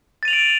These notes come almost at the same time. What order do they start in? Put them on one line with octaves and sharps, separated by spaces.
A6 D#7 F7 F#7 D7